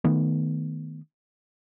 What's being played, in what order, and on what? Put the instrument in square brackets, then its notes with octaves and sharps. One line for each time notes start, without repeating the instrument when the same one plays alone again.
[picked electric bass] D#3 A3 B3